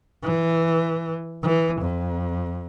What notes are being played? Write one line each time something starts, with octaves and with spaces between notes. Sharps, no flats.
E3
E3
F2